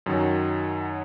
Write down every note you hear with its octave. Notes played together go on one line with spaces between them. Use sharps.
F#2 D#3 F#3